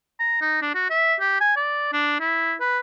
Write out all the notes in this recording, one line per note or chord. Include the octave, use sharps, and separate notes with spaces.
A#5
D#4
D4
F#4
E5
G4
G#5
D5
D4
E4
B4